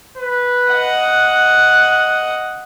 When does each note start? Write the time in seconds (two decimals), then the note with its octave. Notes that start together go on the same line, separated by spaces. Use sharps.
0.17 B4
0.71 D#5 F#5
1.09 F#6